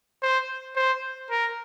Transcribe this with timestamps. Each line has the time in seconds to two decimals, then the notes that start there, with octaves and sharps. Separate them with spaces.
0.23 C5
0.76 C5
1.30 A#4